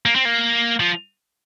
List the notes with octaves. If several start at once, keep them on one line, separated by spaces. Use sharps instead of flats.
A#3
C4
A#3
F3